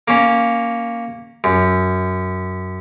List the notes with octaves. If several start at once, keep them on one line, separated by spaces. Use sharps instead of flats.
A#3 C#4
F#2